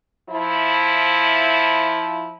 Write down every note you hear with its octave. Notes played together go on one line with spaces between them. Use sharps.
F3 E4